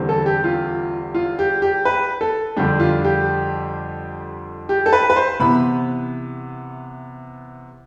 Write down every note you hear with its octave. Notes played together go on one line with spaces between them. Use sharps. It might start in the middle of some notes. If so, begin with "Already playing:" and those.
Already playing: E2 D3 G3 C4
A4
G4
F4
F4
G4
G4
B4
A4
F2 D3 G3 D4 G4
F4
G4
G4
A4
B4
B4
C5
C3 E3 B3 B5